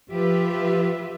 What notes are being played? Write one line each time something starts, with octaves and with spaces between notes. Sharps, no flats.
F3 F4 G4 B4 E5